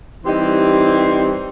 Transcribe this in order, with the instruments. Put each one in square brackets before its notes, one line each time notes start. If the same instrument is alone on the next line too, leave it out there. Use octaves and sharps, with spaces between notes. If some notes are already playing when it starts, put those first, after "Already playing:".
[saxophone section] E3 G3 C4 D#4 G4